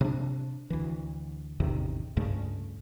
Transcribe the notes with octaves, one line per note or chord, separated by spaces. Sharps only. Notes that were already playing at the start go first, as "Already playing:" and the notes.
C3 C4 D4
D2 E3
A1 E2 C3 D#3
C#2 G2 C#3 A3